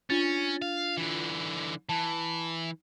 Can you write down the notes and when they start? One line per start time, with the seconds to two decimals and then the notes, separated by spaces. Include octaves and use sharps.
0.10 C#4 D4 F4 A6
0.62 F5
0.97 D3 E3
1.89 E3 A5